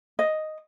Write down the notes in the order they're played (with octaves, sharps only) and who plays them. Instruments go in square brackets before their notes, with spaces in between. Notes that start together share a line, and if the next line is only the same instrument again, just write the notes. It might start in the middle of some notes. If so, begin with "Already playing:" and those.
[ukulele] D#5